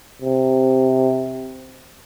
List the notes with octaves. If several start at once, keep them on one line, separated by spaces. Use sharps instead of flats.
C3